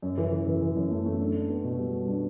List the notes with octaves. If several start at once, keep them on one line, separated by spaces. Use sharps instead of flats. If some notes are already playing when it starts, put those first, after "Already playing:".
F#2
E3
E3
E3
E3
F#2
A3
A3
D4
D4
B3
B2
G3
G3
D4